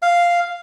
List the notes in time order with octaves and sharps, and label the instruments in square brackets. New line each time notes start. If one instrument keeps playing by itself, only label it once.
[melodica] F5